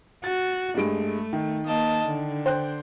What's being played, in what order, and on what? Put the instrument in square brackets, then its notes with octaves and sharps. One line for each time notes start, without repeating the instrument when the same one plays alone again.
[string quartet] F#4 [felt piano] A6
[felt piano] G2 G#3 D7 [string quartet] A3
[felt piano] D#3
[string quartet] A#3 D#5 A5
D3
[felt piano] C5 G5 F#6